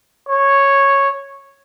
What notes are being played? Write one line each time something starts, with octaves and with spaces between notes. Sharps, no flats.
C#5